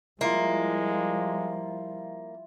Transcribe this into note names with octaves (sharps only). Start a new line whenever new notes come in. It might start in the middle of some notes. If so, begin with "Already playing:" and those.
F3 G3 G#3 A#3 E4 F4